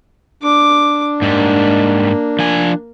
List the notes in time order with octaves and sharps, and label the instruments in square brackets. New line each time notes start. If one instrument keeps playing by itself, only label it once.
[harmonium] D4 [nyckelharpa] D6
[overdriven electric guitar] G#2 G3 [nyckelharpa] A#3
[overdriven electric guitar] F3 G#5